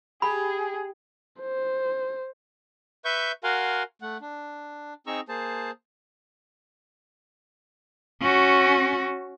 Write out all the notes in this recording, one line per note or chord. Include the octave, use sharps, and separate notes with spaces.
G4 G#4 B5
C5
B4 E5 C#6 G6
F#4 A#4 F5 F#5 G#5 C6
A3 F#5
D4
C4 D#4 G#4 A#5 C#6 E6
A#3 G#4 C5 A5
C#4 F#4